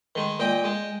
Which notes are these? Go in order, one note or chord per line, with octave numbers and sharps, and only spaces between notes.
D#3 G#3
A#2 D#5 G5
G#3